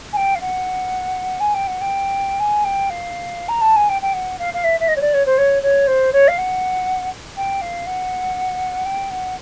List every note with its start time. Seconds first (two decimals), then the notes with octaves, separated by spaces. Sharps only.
0.13 G#5
0.17 G5
0.35 F5
0.41 F#5
1.40 G#5
1.54 G5
1.67 F#5
1.81 G5
2.40 G#5
2.65 G5
2.90 F5
3.49 A#5
3.61 A5
3.76 G#5
3.89 G5
4.02 G5
4.14 F#5
4.39 F5
4.54 F5
4.64 E5
4.80 E5
4.88 D#5
4.96 C#5
5.01 D5
5.14 C#5
5.26 C5
5.38 C#5
5.63 C#5
5.87 C5
6.13 C#5
6.28 F5
6.38 F#5
7.37 G5
7.61 F5
7.87 F#5
8.86 G5
9.11 F#5